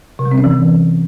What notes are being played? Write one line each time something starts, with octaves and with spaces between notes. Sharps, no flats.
C3
G3
C4
C#4
E3